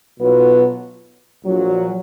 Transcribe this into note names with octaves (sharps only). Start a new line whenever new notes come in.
B1 B2 F#3 B3 F4
A#1 A#2 F#3